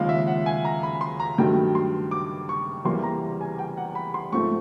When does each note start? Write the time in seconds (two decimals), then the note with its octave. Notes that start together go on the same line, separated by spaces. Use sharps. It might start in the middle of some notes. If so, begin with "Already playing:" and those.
Already playing: D#2 C#3 F3 G#3 F5
0.09 E5
0.27 F#5
0.46 G#5
0.65 A#5
0.83 B5
1.01 C6
1.20 A#5
1.38 G2 D#3 F#3 A3 G5
1.75 C6
2.11 D6
2.49 C#6
2.85 E2 C3 E3 G3 A#3 C6
3.03 A#5
3.41 G#5
3.59 G5
3.77 F#5
3.95 B5
4.14 C6
4.32 G#2 F3 A3 C4 C#6